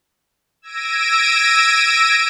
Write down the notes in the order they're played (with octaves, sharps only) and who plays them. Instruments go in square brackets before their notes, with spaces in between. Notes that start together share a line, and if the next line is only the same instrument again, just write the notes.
[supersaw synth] E6 G#6 A#6 D7 D#7